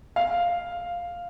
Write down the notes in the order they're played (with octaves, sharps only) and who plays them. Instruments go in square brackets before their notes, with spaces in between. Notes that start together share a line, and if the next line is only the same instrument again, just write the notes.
[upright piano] F5